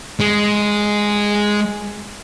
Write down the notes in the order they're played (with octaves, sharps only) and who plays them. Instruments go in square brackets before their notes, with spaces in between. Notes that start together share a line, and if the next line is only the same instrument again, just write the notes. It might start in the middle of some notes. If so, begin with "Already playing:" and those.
[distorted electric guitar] G#3